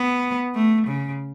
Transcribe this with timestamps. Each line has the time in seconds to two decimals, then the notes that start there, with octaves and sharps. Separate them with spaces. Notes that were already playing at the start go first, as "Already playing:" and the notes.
Already playing: B3
0.55 A3
0.87 C#3